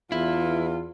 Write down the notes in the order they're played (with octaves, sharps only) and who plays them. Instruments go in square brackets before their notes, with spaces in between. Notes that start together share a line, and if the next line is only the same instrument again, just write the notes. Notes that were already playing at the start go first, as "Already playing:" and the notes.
[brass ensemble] E2 [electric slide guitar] E4 [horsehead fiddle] F4